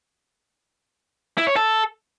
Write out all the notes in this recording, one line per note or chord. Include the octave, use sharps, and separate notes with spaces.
E4
C#5
A4